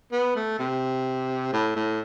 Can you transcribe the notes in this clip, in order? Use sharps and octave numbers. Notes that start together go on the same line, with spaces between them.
B3
A3
C3
A2
A2